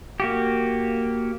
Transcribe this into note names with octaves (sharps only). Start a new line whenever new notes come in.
A#3 F#4 G4